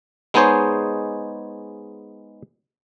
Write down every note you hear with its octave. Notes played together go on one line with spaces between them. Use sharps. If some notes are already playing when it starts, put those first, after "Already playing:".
G#3 B3 D#4 G#4 C5 C#5